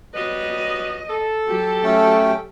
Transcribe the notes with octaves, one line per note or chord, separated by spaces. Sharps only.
F#3 G3 B4 D#5
A4
F#3 G4
A3 C#4 G5